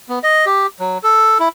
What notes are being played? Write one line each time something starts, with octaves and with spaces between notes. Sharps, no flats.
B3
D#5
G4
F#3
A4
E4